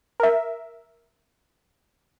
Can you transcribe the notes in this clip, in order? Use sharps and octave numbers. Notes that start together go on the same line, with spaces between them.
A#4 E5